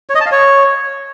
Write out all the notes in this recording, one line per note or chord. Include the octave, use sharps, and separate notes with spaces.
C#5
D#5
A5
F5
C#5